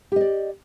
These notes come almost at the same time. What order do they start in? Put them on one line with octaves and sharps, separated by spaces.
G4 D#5 D5